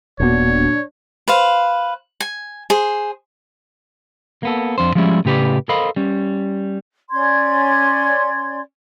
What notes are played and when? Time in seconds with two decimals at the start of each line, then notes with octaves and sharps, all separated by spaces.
0.20 D#1 A#2 A#3 B3 D4 F#4 C#5
1.28 B4 C5 F5
2.21 G#5
2.70 G#4 C5
4.43 A#3 B3 A4
4.78 F2 D4 C5
4.95 F3 G3 G#3 C#4 E4
5.25 A2 C#3 G4 B4 D5
5.69 A4 A#4 C5 D#5 F5 B5
5.96 G3 C#4
7.11 C#4 D5 C6 G#6